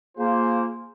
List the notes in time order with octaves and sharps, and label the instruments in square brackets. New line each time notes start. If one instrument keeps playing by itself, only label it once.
[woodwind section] A#3 [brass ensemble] F4 G#4 C5